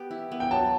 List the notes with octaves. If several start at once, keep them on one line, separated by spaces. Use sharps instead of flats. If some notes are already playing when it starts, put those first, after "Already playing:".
Already playing: B3 G4 B4
E4
B3
G5
F#3 A5